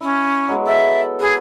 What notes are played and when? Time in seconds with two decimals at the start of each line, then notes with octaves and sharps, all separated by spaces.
0.01 C#4 E4 D#5
0.48 F#3 G#3 B3
0.67 A4 E5
1.20 G#4 B4 F#5 G#5